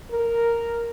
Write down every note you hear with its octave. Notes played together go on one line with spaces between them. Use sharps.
A#4